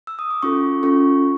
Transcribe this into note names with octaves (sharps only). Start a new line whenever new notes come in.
E6
D#6
D6
C#4 F4 A4 C#6
C#4 F4 A4 C#6